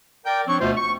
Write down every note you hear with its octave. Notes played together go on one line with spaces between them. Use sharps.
A#4 D5 G5
F3 C4 D4 C#5 C#6
D2 B2 A3 B3 F4 C5
C#6